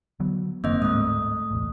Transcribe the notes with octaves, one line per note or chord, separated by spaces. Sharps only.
D3 F#3 B3
F#1 D#3 A#3 C4 D#5
D1 G#2 G#3 A3 D#6
B1 E2 A2